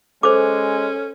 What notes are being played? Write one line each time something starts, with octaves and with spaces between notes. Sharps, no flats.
G#3 C#4 A4 C5 D6